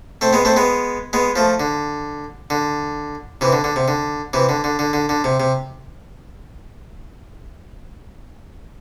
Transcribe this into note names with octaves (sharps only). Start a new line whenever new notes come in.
A3 C4
G#3 B3
A3 C4
G#3 B3
G#3 B3
F3 A3
D3
D3
C3 E3
D3
D3
C3
D3
C3 E3
D3
D3
D3
D3
D3
C3
C3